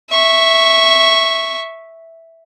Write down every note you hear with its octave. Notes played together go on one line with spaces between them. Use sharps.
E5 C#6